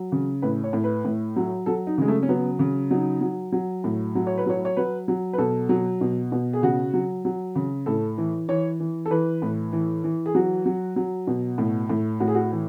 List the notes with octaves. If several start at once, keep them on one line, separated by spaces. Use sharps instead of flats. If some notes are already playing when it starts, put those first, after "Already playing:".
Already playing: F#3
C#3
A2 B4
C#5
A2
B4
A2
F#3
F#3 A4
D#4
C#3 G#3
A3
C#4
F#3 B3
C#3
F#3 D#4
F#3
F#3
A2
F#3
C#5
B4
F#3 C#5
C#5
F#3 B4
F#3
B4
B2 A4
F#3
B2
B2
G#4
C#3 F#4
F#3
F#3
C#3
A2 A4
E3
E3 C#5
E3
A4
E3 B4
A2
E3
E3
G#4
F#3 F#4
F#3
F#3
B2
A2
A2
A2 F#4
G#4
F#4
E3